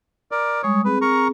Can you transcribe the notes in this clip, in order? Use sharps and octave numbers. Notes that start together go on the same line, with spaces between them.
A#4 D5
G3 G#3 C#5 D#6
C4 G#4 B4
A#4 A#5 C#6